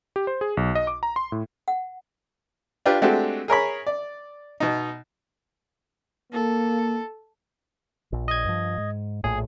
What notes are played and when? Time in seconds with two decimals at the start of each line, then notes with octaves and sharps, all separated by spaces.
0.16 G4
0.27 C5
0.41 G#4
0.57 B1
0.75 D#5
0.87 D6
1.03 A#5
1.16 C6
1.32 A2
1.68 F#5
2.86 D4 F4 G4 B4
3.02 G#3 A3 C4 D4 F#4 G4
3.48 G#4 A#4 C#5 B5
3.87 D5
4.60 B2 D#4
6.33 A#3 A4
8.13 A#1
8.28 D#5 G#6
8.45 G2 F3
8.77 G#2
9.24 A#1 A2 G#4